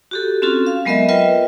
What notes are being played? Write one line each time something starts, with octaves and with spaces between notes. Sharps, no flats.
F#4 G4 A4
C4 C#4 F4 F#4 A4
F5
F#3 G#3 B3 A#4 D#5 E5
F4 A#4 B4 D#5 E5 G5